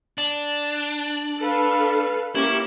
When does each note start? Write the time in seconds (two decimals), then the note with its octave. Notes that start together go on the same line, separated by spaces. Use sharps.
0.18 D4
1.40 A4 B4 F5
2.35 A#3 C#4 E4 G4